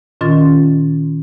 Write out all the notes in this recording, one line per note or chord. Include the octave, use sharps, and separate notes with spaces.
A#2 D#3 C#4 F4 C6 A6